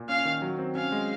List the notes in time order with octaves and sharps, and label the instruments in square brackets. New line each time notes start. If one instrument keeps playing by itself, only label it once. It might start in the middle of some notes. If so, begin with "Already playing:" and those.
Already playing: [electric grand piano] A#2
[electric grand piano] C#4 [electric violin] F5
[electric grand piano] D#3
F#3
C4
[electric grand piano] C#4 [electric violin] F5
[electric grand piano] G#3